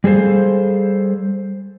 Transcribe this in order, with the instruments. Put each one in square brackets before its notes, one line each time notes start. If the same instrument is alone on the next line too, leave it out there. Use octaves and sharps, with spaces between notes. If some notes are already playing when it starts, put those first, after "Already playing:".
[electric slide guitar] G3 G#4 A4 C5 F5